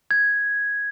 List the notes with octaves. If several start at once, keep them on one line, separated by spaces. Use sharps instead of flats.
G#6